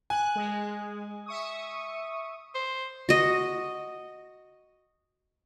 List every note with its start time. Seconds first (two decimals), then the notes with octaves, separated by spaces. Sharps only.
0.10 G#5 F#6
0.35 G#3
1.26 E5 C#6 D#6
2.55 C5
3.09 F#4 D#5